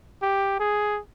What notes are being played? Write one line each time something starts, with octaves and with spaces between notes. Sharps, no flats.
G4
G#4